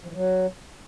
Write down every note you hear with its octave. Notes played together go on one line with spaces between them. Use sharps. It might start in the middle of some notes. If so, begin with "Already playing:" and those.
F3
E3
F#3